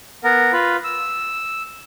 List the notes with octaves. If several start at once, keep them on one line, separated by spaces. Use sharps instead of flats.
B3 A#4
F4 B4
E6